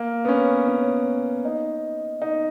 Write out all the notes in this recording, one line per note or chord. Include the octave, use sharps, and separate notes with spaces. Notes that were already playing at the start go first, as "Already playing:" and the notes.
Already playing: A#3
B3
C#4
C#4
D#4
D#4